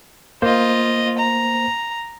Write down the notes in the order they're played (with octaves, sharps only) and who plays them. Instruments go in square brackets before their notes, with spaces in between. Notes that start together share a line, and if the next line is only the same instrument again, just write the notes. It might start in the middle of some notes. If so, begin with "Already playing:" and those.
[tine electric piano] A#3 C5 [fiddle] F4 D#5
[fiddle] A#5